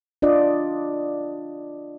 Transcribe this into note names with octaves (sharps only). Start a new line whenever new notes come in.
D4 F4 D5 D#5